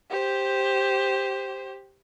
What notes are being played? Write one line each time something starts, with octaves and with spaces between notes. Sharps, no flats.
G4 C5